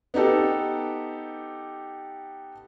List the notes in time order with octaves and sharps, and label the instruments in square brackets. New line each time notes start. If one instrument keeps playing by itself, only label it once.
[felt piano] B3 D#4 G4 A4